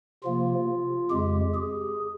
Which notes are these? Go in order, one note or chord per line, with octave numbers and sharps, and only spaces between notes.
C3 F3 A#3 F4
F2 C#3 G#3 G4
G#4